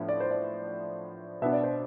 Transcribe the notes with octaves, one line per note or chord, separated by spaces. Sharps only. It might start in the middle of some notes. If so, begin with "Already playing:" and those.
Already playing: A2 F3 B3 D4
D5
C5
D5
B2 B3 D4 E5
D5
C5